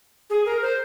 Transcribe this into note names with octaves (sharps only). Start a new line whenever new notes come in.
G#4
A#4
C5